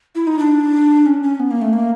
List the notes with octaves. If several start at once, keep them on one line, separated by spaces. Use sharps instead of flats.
E4
D#4
D4
C#4
C#4
B3
A#3
A3
A#3